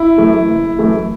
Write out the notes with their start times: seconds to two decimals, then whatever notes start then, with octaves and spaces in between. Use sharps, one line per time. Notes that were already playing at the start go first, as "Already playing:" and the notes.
Already playing: E4
0.18 F#2 E3 A3
0.48 F#1
0.79 F#2 E3 A3